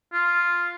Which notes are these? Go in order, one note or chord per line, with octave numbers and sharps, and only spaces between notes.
F4